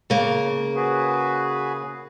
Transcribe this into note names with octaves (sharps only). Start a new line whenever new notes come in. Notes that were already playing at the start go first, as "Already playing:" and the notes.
C#3 A#3
F#4 G#4 B4